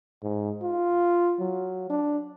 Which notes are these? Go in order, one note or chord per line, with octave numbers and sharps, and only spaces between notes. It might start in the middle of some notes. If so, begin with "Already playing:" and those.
G#2
F4
F#3
D4